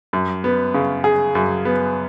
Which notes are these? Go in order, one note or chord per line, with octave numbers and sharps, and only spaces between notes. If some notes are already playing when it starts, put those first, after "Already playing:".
F#2
B3
C#3
G#4
F#2
B3